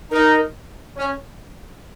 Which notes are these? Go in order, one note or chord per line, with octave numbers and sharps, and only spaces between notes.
D#4 A#4
C#4